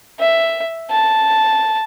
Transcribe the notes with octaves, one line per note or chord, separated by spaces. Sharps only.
E5
A5